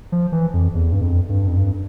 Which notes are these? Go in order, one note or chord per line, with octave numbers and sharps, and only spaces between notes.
F3
E3
F2
E2
G2
F2
G2
F2
G2